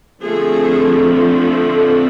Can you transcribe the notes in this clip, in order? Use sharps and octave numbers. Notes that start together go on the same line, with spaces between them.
D3 F3 A3 C4 G#4